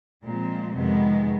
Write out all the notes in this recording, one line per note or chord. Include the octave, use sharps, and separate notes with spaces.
A#2 F3 G#3 C4
F2 C3 D#3 G#3 B3